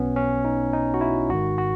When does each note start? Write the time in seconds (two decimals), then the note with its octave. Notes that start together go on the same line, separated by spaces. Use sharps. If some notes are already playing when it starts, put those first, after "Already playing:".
Already playing: B1 B2 B3 C#4
0.16 C#4
0.45 D#4
0.73 D#4
0.94 F#4
1.01 E4
1.30 G#1 G#2 D#3 F#4
1.58 F#4